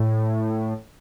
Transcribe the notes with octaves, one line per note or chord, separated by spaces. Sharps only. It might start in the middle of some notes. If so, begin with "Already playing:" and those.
Already playing: A2